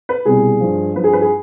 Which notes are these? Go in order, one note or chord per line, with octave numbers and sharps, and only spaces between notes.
B4
C2 B2 G3 G#4
G2 F3
G2 F3 B4
G#4
B4
G#4